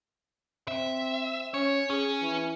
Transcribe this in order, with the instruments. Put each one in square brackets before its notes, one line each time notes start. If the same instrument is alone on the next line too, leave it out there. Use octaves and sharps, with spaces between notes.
[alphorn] C4 [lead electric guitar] E5
[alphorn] C#4 [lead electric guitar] C#5
[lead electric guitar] C#4 [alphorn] G#4
[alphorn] E3